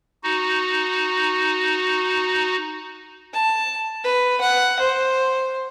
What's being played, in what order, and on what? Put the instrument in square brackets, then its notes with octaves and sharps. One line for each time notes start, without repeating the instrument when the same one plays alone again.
[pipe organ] D#4 F#4
[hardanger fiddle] A5
B4
F#5
C5